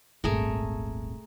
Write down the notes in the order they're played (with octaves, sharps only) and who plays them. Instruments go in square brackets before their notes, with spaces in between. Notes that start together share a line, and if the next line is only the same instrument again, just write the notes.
[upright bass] D#1 G#1 [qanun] A3 G#4 A#4